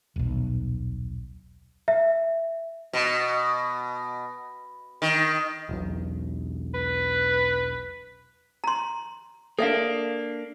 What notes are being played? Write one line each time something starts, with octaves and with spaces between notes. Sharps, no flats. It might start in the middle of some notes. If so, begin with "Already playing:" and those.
D#1 B1
E5
B2
D#3
E1 B1
B4
A#5 C6
A#3 D4 A4 E5 F5